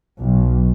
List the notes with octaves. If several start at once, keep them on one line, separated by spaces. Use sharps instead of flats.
B1